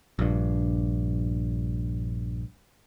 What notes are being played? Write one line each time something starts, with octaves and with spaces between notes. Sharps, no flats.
A#1 G2